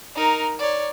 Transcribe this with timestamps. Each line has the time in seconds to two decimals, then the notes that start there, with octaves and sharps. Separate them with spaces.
0.15 D#4 A#4
0.59 C#5 D5